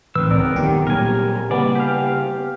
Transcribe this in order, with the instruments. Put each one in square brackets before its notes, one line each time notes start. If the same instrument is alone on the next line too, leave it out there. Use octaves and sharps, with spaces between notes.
[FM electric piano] A1 [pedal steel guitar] D#3 C4 E6 [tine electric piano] B4
[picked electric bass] C#2 [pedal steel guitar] B3 A#4 [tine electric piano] C4 [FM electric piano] D5
[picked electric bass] D#1 F#2 B3 [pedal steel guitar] D#3 [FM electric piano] G4
[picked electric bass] A#2 F#3 G3 [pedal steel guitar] A#4 G#5
[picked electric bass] C#3 A#3 [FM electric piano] G3 B3 [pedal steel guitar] D5 [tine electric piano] G#5
[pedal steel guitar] G4 F5